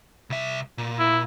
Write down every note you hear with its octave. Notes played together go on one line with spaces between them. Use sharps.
C2 E5
A#2
E4